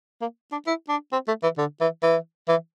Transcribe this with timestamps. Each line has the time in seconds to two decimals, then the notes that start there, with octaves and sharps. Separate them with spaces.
0.21 A#3
0.52 D4
0.67 E4
0.89 D4
1.12 C4
1.28 A3
1.43 E3
1.58 D3
1.81 E3
2.03 E3
2.48 E3